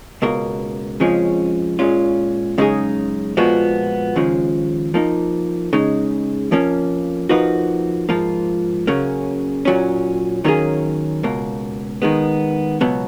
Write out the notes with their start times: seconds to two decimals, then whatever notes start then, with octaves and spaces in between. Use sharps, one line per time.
0.22 C#2 B2 A#3
1.00 F2 C#3 F3 G#3 C#4
1.79 A#2 G#3 C#4 F4
2.58 F#2 C#3 G#3 D#4 G#4
3.37 A#2 F3 G#3 B3 F#4
4.16 D#2 C#3 F3 G#3
4.94 F3 A#3 D#4
5.73 C#3 G#3 D#4
6.51 F2 F3 A#3 C#4
7.29 F3 A#3 D#4 F#4 B4
8.09 G#2 F3 A#3 F4
8.87 C#3 F#3 A#3 C#4
9.65 A#2 F#3 C#4
10.45 D#3 F#3 A#3 C#4 G#4
11.23 C#2 B2 A#3
12.02 D#3 G#3 B3
12.81 C#2 B2 F#3 B3